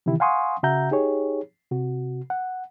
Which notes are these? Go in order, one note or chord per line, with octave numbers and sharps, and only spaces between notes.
C3 D#3 E3 E4 G4
F5 F#5 G#5 C6 C#6 D#6
C#3 F#4 E5 F#5 A#5 G6
D#4 G4 G#4 C#5
C3 F#4
F#5